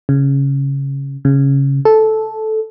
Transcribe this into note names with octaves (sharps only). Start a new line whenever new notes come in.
C#3
C#3
A4